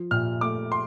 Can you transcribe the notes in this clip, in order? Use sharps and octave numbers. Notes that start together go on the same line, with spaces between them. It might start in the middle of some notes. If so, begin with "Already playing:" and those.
Already playing: F3
A#2 F6
A3 D6
C6